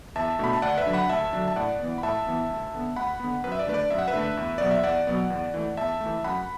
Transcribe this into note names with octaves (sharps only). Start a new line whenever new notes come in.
E2 E5 A5
B2 A3 D4 B5
A5
D2 D5 F#5
B4 E5
D3 F#3 D4
F#5 B5
D2 E5 A5
D3 F#3 D4
A5
A2 D5 F#5
E3 B3
B5
A2 E5 A5
E3 B3
D2
D3 B3
D2 F#5 B5
D3 B3
F#2 B4
E5
D5
D3 A3 D4 B4
D5
F#2 E5
F#5
B4 E5
D3 A3 D4
E2
B2 F#3 B3 D5
E5
E2 D5 F#5
B2 F#3 B3
E2
E3 A3
E2 E5 A5
E3 A3
F#2 F#5 B5